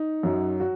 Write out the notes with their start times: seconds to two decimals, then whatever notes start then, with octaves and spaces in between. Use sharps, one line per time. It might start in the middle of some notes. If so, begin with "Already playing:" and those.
Already playing: D#4
0.23 F#2 F#3
0.60 F#3 F#4